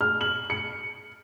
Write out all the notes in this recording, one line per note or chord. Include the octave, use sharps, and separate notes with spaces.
F6
F#7
C#7